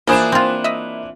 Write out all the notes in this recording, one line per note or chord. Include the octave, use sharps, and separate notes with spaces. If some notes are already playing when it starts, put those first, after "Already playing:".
E3 F3 A#3 D4 G#4 C5 B5 E7
C4 F4
D#5 E5